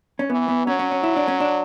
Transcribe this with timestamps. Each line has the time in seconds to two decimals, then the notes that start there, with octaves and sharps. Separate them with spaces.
0.19 C#4
0.30 E3 B3
0.48 B3
0.66 F#3 C#4
0.79 C#4
0.91 C#4
1.03 E4
1.16 D4
1.28 C#4
1.40 D4